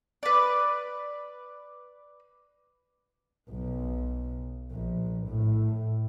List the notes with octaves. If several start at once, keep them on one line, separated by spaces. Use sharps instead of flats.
B4 D5
B1
A#1
A2